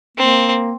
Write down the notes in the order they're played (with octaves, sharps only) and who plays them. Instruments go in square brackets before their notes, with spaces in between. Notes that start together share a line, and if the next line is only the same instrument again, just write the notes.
[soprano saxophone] A#3 [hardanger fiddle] C4